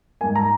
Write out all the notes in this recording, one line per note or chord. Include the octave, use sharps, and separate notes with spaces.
G#2 G3 A#3 G#5
A#5